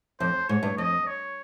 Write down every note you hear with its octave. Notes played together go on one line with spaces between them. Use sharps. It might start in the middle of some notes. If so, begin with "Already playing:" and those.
F2 C5
G#2 C#5
G2
F2 D#5
C#5